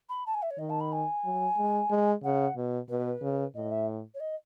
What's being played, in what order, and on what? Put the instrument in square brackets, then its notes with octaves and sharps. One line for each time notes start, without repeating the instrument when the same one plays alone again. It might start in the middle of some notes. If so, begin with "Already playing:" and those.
[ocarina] B5
A5
G#5
E5
C#5
[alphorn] D#3 [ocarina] D#5
[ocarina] A5
B5
G#5
[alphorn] F#3
G#3
G#3
[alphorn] C#3 [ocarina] F#5
[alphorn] B2
[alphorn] B2 [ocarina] B4
[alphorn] C#3
[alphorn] A2 [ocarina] D#5
[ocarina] E5
C#5
D#5